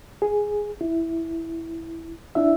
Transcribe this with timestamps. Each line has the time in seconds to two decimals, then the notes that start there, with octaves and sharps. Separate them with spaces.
0.22 G#4
0.81 E4
2.35 D4 E4 E5